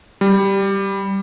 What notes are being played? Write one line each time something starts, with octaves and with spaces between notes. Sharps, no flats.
G3